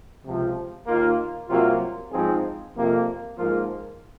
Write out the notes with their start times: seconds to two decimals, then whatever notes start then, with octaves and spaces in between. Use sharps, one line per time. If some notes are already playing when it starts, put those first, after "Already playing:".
0.23 C#2 C3 F3
0.86 D#2 D#3 A#3 F4 A#4
1.49 C2 C3 F#3 A#3 F4
2.11 G#2 F3 C4 D#4 G#4
2.74 F2 C3 F3 A#3
3.36 G#2 F3 A#3 F4 A#4